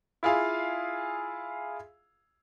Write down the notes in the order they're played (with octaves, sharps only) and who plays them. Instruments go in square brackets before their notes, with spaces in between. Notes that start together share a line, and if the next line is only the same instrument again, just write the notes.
[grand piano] E4 F4 G#4 F5